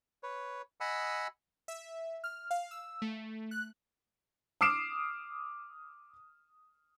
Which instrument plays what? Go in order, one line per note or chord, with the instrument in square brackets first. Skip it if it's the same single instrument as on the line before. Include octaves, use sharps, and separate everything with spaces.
[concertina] B4 C#5
D#5 F#5 G#5 B5 D#6 E6
[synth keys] E5
F6
F5
E6
A3
F#6
[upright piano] D6 D#6 F6 C7 D7 E7